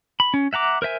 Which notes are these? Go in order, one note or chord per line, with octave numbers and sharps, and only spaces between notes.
B5
C#4
E5 F#5 A#5 D6
A#4 C5 E5 G#5